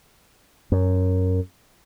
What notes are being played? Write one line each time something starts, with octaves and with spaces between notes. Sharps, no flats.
F#2